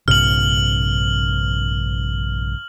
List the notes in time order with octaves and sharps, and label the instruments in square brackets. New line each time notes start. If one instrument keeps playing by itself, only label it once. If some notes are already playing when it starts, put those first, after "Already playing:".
[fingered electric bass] A#1 G2 C3 [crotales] F6 F#7